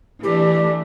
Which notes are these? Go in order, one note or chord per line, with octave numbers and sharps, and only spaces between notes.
E3 A3 D4 G4